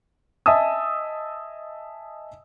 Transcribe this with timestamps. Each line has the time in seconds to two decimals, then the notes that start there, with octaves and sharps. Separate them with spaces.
0.46 D#5 E5 G#5 A5 D#6 E6